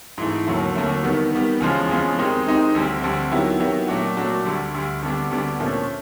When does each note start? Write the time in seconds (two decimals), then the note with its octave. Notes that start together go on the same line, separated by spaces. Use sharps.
0.18 G#2 E3 A3
0.47 D#2 D3 F#3 A3
0.75 D#2 D3 F#3 A3
1.03 D#3 G3 B3
1.32 D#3 G3 B3
1.60 E2 C#3 F3 G#3
1.89 E2 C#3 F3 G#3
2.17 D#3 G#3 C4 D#4 G4
2.46 D#3 G#3 C4 D#4 G4
2.75 D2 D3 G3 C4
3.02 D2 D3 G3 C4
3.32 D#3 F#3 B3 E4 G4
3.60 D#3 F#3 B3 E4 G4
3.88 A#2 F#3 A3 D4 F#4
4.16 A#2 F#3 A3 D4 F#4
4.45 D2 D3 G3
4.74 D2 D3 G3
5.02 D2 D3 G3 B3 D4
5.30 D2 D3 G3 B3 D4
5.59 A#2 F3 A3 C#4